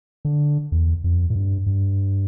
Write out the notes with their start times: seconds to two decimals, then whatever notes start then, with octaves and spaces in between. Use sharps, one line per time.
0.25 D3
0.72 E2
1.04 F2
1.30 A2
1.36 G2
1.66 G2